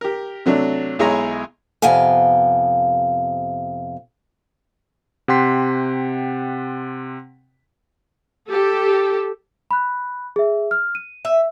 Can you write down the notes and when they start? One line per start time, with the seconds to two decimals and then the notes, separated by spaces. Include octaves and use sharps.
0.01 G4 A#4
0.46 C3 F#3 A3 D4
0.99 B1 G#3 E4 G#4 C#5 A#5
1.82 F2 C3 B3 F5 G5 G#5
5.28 C3 F#5 G5 C6 B6
8.48 G4 A4
9.71 B5 F#6
10.36 G#4 E5
10.71 F6
10.95 D#7
11.25 E5